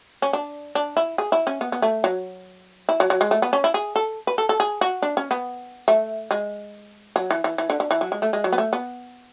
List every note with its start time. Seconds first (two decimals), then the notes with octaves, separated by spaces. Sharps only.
0.22 C#4
0.33 D4
0.75 D4
0.97 E4
1.18 G#4
1.32 E4
1.47 C#4
1.61 B3
1.72 B3
1.82 A3
2.04 F#3
2.89 E4
3.00 F#3
3.10 F#3
3.21 G#3
3.31 A3
3.42 B3
3.53 C#4
3.64 E4
3.74 G#4
3.96 A4
4.27 B4
4.38 A4
4.49 A4
4.60 G#4
4.81 F#4
5.02 D4
5.17 C#4
5.31 B3
5.88 A3
6.31 G#3
7.16 F#3
7.31 E3
7.44 E3
7.58 E3
7.70 D3
7.80 D3
7.91 E3
8.01 F#3
8.12 G#3
8.22 A3
8.33 G#3
8.44 F#3
8.52 B3
8.58 A3
8.73 B3